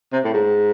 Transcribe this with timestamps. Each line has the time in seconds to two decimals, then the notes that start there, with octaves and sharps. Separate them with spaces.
0.12 C3
0.24 A2
0.34 G#2